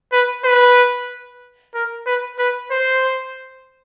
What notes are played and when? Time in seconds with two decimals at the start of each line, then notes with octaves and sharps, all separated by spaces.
0.12 B4
0.44 B4
1.74 A#4
2.06 B4
2.39 B4
2.71 C5